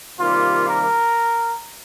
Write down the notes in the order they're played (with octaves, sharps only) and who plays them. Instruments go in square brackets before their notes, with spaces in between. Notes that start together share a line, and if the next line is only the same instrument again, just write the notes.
[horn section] C3 D#3 G3 A#3 F4
A#4